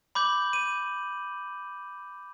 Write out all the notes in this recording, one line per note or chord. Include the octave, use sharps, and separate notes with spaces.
B5 D6 G6 F#7
D#7